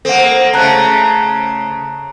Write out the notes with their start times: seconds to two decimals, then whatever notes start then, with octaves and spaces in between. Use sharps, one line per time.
0.05 A#3 C4 A4 F#5
0.54 C#3 A3 A5 A#5 F#6